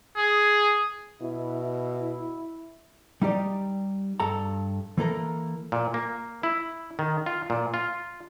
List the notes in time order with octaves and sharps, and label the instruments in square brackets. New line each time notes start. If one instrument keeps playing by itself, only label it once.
[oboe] G#4
[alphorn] B2 [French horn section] E4
[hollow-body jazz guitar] G3 D#4 G4 D5
G2 A4 A#5
E3 A#3 A4 A#4
[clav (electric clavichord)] A#2
A#3
E4
D#3
F4
A#2
F4